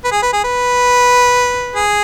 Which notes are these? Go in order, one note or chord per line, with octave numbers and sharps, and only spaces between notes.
B4
G#4
B4
G#4
B4
G#4